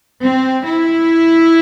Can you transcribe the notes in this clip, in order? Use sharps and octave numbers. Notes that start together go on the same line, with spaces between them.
C4
E4